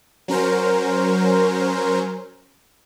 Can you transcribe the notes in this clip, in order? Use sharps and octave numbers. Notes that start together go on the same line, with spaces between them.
F#3 C#4 A#4 C5